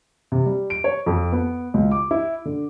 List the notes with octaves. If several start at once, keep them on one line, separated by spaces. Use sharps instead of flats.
C3
G3
D7
C#5
F2
B3
C#2
D6
E4
D3